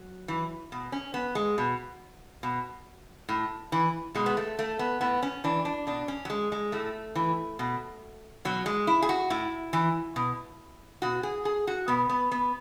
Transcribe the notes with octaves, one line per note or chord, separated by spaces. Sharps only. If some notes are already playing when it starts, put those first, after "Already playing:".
Already playing: F#3
E3
B2
C#4
B3
G#3
B2
B2
A2
E3
B2 G#3
B3
A3
A3
B3
A2 B3
C#4
E3 D4
D4
B2 D4
C#4
F#3
G#3
G#3
A2 A3
E3
B2
B2 F#3
G#3
E4
G#4
F#4
A2 E4
E3
B2
B2 F#4
G#4
G#4
F#4
B2 B3
B3
B3